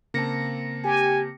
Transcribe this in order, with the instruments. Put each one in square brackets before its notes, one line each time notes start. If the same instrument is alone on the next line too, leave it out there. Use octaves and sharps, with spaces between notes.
[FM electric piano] C#3 A#6 C#7 [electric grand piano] A#3 C4 A5
[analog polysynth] G4 [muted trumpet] G#5